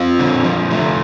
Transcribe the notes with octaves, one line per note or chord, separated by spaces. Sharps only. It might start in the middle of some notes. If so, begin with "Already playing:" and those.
Already playing: C4 F4
D3
F3
A3